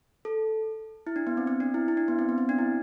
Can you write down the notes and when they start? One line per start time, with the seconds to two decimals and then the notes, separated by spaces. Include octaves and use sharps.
0.25 A4
1.07 E4
1.16 D4
1.27 B3
1.37 C4
1.47 C4
1.60 D4
1.74 E4
1.88 E4
1.97 D4
2.08 B3
2.19 C4
2.29 B3
2.38 C4
2.49 D4
2.58 E4